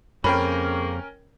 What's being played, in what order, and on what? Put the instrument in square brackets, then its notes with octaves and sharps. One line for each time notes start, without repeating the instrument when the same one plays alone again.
[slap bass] F2 [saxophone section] C#3 A#3 [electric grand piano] C#4 A#4 G5 [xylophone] B5